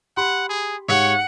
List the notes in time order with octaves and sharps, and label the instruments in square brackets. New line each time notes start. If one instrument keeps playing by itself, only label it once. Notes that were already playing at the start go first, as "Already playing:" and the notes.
[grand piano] G4 B5 C6 [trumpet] F#5
[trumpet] G#4
[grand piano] G#2 G4 F5 [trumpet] C#5 [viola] F#5